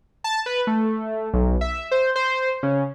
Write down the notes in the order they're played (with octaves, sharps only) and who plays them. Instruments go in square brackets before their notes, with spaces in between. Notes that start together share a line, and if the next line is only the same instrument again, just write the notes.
[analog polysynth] A5
B4
A3
B1
E5
C5
C5
C#3